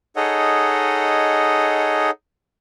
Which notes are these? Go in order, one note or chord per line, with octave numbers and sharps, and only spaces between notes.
D#4 G#4 A4 C#5 D#5 F#5